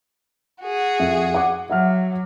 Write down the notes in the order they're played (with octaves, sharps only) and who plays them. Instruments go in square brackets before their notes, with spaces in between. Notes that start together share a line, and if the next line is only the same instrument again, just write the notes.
[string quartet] F#4 G#4
[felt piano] F2 E5
F#5 D6
[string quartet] F#3 [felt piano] E5 F#5 F6